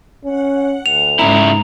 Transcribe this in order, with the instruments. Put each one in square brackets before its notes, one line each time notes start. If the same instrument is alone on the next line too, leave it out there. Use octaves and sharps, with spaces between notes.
[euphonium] C#4 [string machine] F#5
[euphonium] D2 [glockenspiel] F7
[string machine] G#2 [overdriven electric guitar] C#3 E4 [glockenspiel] A#5